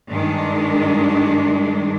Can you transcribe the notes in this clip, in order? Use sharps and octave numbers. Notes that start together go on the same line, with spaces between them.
G2 D#3 G#3 D4